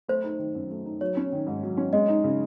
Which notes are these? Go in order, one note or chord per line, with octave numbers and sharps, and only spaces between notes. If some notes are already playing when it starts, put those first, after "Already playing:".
A3 C5
D#4
D#3
F#2
A3
D#4
F#3 C#5
C#4
D#3
G#2
F#3
C#4
G#3 D#5
D#4
C#3